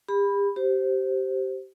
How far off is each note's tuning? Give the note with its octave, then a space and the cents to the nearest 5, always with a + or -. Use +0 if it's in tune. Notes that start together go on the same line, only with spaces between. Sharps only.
G4 +40 B5 +0
G4 -20 C5 +0